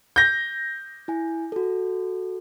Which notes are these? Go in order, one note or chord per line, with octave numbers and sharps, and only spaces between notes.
G6 A#6
E4 G#5
F#4 A4